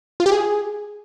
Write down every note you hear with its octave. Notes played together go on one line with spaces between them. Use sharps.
F4
G4
G#4